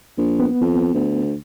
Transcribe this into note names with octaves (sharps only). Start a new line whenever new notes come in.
A#1
B3
F2
D2